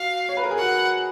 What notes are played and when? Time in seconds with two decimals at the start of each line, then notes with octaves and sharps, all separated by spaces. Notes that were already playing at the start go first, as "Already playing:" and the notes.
Already playing: F#4 F5
0.29 C#5
0.37 B4
0.44 A#4
0.51 G#4
0.58 F#4 F#5